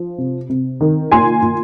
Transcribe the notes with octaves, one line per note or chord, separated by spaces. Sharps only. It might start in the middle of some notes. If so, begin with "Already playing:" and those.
Already playing: F3
C3
C3
D#3
A#2 G#5 C6
A#2